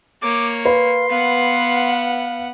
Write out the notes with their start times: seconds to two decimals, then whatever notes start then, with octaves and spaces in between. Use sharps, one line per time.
0.22 A#3 C#5 D6
0.65 B4 F5 C6
1.10 B3 F5 F#5